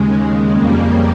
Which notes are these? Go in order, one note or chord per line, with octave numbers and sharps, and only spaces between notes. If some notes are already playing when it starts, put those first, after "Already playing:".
Already playing: D#2 C#3 G#3
F2 C#3 G3 A#3